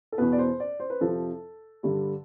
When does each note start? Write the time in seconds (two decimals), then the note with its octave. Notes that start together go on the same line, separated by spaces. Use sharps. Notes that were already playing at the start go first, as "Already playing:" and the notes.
0.12 A4
0.18 E2 B2 B3 B4
0.32 D5
0.39 C5
0.60 D5
0.80 C5
0.90 B4
1.00 F2 C3 F3 A4
1.83 G2 D3 G3